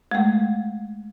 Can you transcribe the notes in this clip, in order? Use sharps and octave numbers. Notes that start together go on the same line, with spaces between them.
G#3 A3